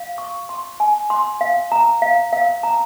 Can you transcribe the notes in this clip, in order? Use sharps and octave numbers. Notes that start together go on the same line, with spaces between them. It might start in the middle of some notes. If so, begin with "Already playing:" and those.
Already playing: F5
C#6
C6
G#5
C6
F5
A#5
F5
F5
A#5